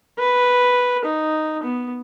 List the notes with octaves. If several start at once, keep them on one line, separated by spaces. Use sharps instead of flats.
B4
D#4
B3